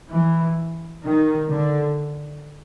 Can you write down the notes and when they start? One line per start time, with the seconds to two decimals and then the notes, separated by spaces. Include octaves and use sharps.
0.10 E3
1.03 D#3
1.49 D3